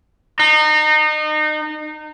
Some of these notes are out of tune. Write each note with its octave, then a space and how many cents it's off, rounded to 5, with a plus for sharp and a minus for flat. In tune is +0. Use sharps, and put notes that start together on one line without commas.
D#4 -30